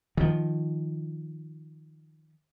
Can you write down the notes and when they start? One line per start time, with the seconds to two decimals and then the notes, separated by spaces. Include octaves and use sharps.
0.17 D#3 F3